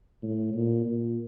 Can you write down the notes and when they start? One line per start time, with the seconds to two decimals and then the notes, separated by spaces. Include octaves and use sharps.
0.23 A2
0.54 A#2
0.85 A#2